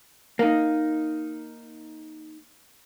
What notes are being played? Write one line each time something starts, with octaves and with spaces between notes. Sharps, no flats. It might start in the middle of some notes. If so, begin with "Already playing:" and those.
A#3 D#4